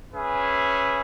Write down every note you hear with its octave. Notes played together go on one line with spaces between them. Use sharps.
C#4 G#4 B4 E5